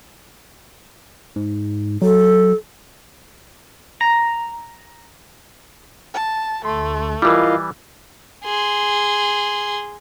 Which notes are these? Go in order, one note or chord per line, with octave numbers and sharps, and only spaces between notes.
G#2
F#3 A4
A#5
A5
D2 A3 C6
E3 G3 E4 F4 A#4 D#5 F5
G#4 C6